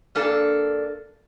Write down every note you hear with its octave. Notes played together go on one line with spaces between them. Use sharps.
G2 A#3 D4 A4